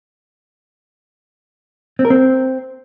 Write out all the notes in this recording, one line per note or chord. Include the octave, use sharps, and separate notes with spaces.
C4
A#4
C4